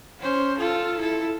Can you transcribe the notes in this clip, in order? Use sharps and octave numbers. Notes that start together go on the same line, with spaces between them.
C#4 C5
F4 A4
E4 A4